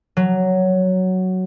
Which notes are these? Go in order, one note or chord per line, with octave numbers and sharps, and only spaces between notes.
F#3